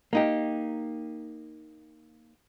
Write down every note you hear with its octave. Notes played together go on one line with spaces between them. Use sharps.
A#3 D#4 G4